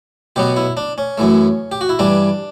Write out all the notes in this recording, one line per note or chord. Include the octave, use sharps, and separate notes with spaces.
B2 F#3 B3 G4
E4
D4
C#4
F#2 E3 A3
G4
F#4
E4
G2 E3 G3 D4